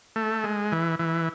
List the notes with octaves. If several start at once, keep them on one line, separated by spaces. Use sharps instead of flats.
A3
G#3
E3
E3